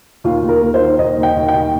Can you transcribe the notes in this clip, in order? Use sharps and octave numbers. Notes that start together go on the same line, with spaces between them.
D#2 F4
D#2
A#4
A#3
C5
D#3
D#2 D#5
D#2
G5
D#2
G5
D#2